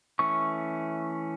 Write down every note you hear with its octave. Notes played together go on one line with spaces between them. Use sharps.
E3 A3 C#4 C#6